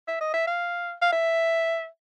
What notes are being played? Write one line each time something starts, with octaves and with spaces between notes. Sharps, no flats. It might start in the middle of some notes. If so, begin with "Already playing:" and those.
E5
D#5
E5
F5
F5
E5